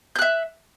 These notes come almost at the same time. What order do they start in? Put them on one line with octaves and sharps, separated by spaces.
G6 F#6 E5